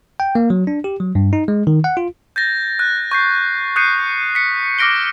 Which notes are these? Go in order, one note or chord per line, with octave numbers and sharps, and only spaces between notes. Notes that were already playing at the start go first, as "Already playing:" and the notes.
G5
A#3
F#3
D4
G4
F#3
G2
D#4
G#3
D#3
F#5
F4
G6 A6 A#6
F#6
C#6 G6 C7
D#6 F#6 G6 C7 C#7 D#7
B6 C#7
D6 F6 A#6 D7 G7